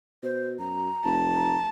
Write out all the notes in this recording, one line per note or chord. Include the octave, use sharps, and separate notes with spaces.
B2 C5
F#2 A#5
F1 A5
A#5